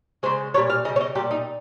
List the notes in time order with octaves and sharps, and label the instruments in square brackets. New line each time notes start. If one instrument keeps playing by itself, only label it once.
[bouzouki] C#3 G#3 C5
A#2 G3 C#5
F5
C#3 D#5
G3
C#5
D#5
A#2 G3 G4
D#4